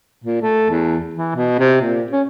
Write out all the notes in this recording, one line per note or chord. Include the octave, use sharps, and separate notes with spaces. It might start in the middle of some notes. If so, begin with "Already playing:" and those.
A#2
A3
E2
E3
B2
C3
A#2
C#4